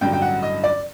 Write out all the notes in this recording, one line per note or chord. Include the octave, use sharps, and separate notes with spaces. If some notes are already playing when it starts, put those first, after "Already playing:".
A1 G2 D3 F#3 G5
G5
F#5
D#5
D5